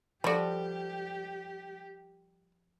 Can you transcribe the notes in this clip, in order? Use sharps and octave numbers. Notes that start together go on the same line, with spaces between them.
F3 G3 F#4 G4 A4 D5 A5